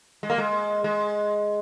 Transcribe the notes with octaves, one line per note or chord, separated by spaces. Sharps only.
G#3
A#3
G#3
G#3